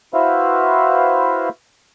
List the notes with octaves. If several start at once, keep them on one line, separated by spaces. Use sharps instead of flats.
E4 F#4 B4 C5 E5 F5